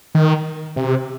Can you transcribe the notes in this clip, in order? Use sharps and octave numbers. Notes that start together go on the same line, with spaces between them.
D#3
C3